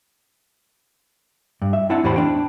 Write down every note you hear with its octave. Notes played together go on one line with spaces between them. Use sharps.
G2
E5
C4 D4 E4 D5 F#5 A5
E2 A2 E3 G4 C5 B5
D4 G5